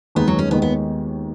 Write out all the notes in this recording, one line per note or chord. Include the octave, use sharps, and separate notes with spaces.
D#2 D#3 G#3 B3 D#4
F#3
C#4
D#2 D#3 G#3 B3
B3